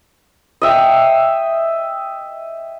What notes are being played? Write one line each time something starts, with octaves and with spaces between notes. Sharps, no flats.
D#5 E5 G5